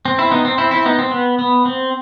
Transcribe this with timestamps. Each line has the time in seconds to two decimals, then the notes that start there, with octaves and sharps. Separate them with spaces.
0.05 C4
0.18 C4 E4
0.31 B3 D#4
0.45 C4
0.58 C4 E4
0.71 C4 E4
0.85 B3 D#4
0.99 C4
1.11 B3
1.39 B3
1.66 C4